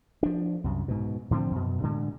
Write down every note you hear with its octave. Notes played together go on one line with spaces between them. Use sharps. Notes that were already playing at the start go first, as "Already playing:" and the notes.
F3 D4
C2 F#2
G#2 B2
A2 D3 F3 C4
F#2 B2
A2 D3 G#3